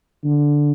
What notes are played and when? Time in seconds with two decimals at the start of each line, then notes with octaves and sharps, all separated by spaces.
0.24 D3